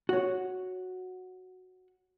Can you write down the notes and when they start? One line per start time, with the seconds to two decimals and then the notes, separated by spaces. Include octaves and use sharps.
0.09 F#4 C#5